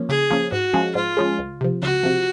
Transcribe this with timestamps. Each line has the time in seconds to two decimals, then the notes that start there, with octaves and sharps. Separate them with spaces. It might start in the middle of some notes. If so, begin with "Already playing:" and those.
Already playing: F3 A#3 C#4
0.09 C#3 G#4
0.30 F3 A#3 C#4
0.52 G#2 F#4
0.73 F3 G#3 C#4 G#4
0.95 G#2 F4
1.17 F3 G#3 C#4 G#4
1.39 C#2
1.61 C3 F3
1.82 C#2 F#4
2.03 C3 F3